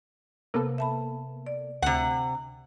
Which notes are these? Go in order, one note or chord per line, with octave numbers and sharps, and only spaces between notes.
C3 A#3 B3 A4
E5 A5 B5
D5
D2 C3 F#5